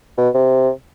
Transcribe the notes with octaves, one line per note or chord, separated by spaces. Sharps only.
B2
C3